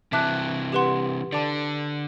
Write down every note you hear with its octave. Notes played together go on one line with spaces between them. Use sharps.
C3 E3 E5 A5 D6 F#6
G4 B4 F#5 C6
D3 D5 A5 D6